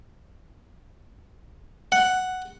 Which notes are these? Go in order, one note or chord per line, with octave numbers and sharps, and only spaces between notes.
F#5